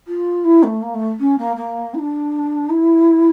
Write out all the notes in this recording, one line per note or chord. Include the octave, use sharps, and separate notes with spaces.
F4
E4
A3
A#3
A3
C#4
A#3
A#3
E4
D4
E4